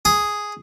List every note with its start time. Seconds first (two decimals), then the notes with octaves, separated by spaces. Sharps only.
0.05 G#4